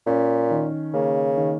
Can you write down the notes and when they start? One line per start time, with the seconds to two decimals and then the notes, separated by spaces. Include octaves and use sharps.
0.07 A#2 C#4
0.51 D#3
0.94 C#3 A#3
1.37 D#3